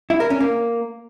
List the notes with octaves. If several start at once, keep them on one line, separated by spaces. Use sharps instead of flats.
E4
A#4
C#4
A#3